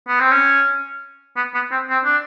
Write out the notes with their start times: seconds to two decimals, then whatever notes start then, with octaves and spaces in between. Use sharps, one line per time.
0.08 B3
0.20 C4
0.31 C#4
1.36 B3
1.54 B3
1.72 C4
1.90 C4
2.05 D4